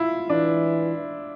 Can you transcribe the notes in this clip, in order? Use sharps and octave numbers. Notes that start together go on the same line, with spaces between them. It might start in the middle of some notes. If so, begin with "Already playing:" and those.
Already playing: E4 F4
E3 D4